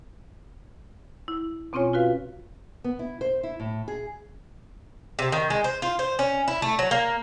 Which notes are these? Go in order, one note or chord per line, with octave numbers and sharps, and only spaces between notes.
E4
B2 C4 C#4 F4 C#5 G#5
F4 F#4 B4 F5
B3
E4
C5
E4
A2
G#4
C3
D#3
G#3
C5
F4
C5
C#4
E4
A3
F#3
A#3